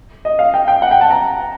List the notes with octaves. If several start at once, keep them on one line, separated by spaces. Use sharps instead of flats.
D#5
F5
G5
G5
F#5
G5
A5
A#5